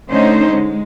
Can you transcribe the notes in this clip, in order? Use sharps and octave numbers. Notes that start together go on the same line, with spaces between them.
D3 A3 C#4 D#4 C5
G#3